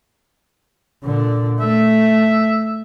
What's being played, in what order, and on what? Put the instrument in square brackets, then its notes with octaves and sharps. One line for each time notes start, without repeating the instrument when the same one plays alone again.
[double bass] A#2 D3
[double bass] A3 [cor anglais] E5